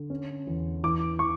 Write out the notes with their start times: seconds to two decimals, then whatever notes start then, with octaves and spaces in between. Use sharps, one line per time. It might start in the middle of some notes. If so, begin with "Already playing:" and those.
Already playing: D3
0.10 C#4
0.47 E2
0.84 E3 D6
1.19 E3 C#6